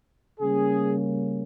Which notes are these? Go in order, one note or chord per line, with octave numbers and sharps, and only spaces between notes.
C#3 G3 A#3 C#4 G#4